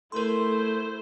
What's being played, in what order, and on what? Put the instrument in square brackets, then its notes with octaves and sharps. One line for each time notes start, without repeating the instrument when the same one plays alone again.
[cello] A3 [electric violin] E4 C5 [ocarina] A4 [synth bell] A#4 C6